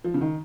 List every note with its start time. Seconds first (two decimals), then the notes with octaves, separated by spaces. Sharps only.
0.04 F3
0.14 C#3
0.21 D#3